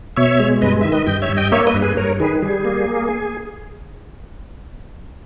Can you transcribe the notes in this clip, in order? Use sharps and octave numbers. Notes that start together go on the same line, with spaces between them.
B2 C#5 E5
G#3
G2 B4 D#5
D#3 E5
B4 D#5
G2 D#5 G5
C#5 E5
G2
D#5 G5
A#3 C#5 E5
B4 D#5
G2
G#4 B4
G2 A#4 C#5
D#3 G#4 B4
G3 G#4
A#3